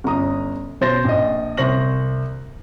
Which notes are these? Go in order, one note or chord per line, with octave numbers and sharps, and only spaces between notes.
G1 C#4 A#5 D#6
B2 C5 A6 A#6
A#1 D#5
C2 C5 C#6 A#6 F#7